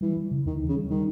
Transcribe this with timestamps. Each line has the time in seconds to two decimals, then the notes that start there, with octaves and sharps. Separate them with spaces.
0.01 E3 G3
0.17 G3
0.31 C#3
0.45 D#2 D#3
0.62 E3
0.68 C#3
0.75 G3
0.90 D#3 G3